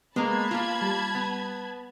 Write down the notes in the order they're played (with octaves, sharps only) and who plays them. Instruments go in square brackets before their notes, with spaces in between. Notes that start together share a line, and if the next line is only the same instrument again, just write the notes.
[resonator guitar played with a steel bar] G#3 A#3 [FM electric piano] B3 [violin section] A5 B5 G#6
[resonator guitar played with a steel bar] A#3 F4
[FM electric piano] G3
[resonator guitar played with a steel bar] B3